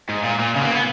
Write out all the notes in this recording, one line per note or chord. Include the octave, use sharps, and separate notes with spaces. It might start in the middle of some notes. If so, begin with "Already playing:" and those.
G#2
A#2
A#2
C#3
B3
A#3
C#4
B3